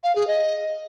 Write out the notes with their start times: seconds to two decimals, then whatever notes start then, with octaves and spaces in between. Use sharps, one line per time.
0.04 F5
0.16 G#4
0.28 D#5